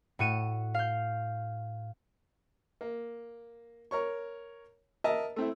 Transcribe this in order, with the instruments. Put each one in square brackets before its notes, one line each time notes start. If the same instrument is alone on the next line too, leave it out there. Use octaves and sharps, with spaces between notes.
[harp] A2 F#4 C#7 D#7 E7
F5 G6
[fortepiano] A#3
A#4 C#5 C#6
A#4 D#5 E5 A5
A3 C4 E4